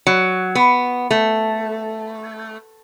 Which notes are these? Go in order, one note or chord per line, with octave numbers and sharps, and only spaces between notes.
F#3
B3
A3